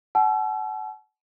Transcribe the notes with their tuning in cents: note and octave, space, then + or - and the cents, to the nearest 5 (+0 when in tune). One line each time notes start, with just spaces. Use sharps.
F#5 +30 A5 -45 E6 +35